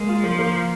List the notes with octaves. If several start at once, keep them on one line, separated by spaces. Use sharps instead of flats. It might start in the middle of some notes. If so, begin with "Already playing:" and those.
Already playing: G#3 A#3
F4
F3 A#3
A#3